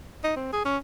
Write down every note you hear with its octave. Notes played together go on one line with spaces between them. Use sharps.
D#4
C4
G#4
C#4